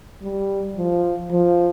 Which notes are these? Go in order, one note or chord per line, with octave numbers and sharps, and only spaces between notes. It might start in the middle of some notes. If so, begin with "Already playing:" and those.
G3
F3
F3